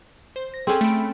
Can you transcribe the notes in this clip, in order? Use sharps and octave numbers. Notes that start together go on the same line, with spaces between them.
C5
A#6
C4 C#4 G#4 A4 G#5
A3 B5 D7